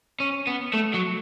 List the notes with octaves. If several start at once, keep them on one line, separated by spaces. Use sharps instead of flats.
C#4
B3
A3
F#3